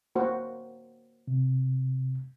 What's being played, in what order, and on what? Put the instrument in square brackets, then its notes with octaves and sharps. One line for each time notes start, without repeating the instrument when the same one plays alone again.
[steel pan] A#3 F#4 C5
[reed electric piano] C3